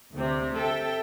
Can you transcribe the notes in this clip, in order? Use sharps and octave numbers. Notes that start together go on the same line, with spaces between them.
D2 C3
A4 E5 G5